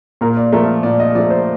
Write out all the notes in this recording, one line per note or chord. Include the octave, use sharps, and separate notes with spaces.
A#2 A#4
D5
F3 A3 A#4
A#2 D5
D#5
F3 A3 D5
C5